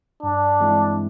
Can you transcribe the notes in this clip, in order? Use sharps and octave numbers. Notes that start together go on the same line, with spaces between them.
G2 D4
E3 G#3 C4 E4